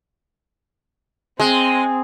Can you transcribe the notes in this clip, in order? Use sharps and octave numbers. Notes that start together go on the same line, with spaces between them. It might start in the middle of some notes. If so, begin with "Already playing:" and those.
G#3 C4